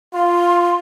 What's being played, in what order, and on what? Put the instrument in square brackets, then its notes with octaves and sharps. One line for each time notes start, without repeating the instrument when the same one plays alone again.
[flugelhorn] F4 [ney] C6